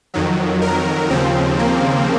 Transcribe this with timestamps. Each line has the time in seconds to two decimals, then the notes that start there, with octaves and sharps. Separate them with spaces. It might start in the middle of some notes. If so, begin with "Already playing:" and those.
0.14 F2 D#3 F#3
0.62 A#4
1.10 D#2 C#3 F3 C4
1.59 A#3